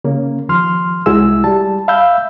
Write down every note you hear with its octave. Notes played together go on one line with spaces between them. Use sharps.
C#3 A#3 C#4
D#2 F3 C6 F6
C2 G#3 E4 F#4 G#4 E6
G3 A5
E5 F5 B5 E6 G6